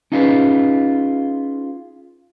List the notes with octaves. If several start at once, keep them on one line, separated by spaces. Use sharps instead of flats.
C#4 D#4 F4 G#4 B4